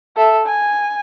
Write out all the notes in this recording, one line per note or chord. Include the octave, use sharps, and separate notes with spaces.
A4 E5
G#5